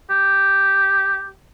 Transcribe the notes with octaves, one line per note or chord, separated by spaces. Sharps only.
G4